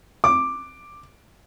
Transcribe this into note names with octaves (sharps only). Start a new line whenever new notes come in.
D6